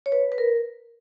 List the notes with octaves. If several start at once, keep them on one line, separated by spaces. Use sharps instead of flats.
C#5
B4
B4
A#4